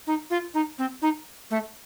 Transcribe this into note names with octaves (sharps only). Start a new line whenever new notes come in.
D#4
F4
D#4
C4
D#4
A3